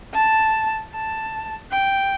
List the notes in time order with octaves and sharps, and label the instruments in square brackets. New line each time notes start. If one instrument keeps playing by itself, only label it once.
[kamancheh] A5
A5
G5